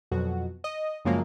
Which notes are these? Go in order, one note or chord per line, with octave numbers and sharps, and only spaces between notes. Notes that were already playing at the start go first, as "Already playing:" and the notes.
F2 B2 F#3 F#4
D#5
F#2 C#3 F3 F#3 G#3 A#3